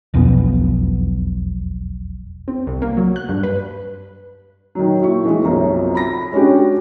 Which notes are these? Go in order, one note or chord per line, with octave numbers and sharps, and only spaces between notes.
E1 B1 F2 B3
C4
C2
A#3
F#3
F#6
G2
B4
D#3 F#3
A#2 E4 C#6
E3 G#3
B1 F#2 C3 F3
B5 A#6
G#3 C#4 D4 F#4 G4